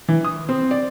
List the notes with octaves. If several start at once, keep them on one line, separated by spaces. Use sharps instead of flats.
E3
D#6
C4
D5